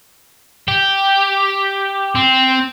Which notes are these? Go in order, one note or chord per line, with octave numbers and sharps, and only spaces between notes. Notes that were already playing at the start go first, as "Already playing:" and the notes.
G4
C4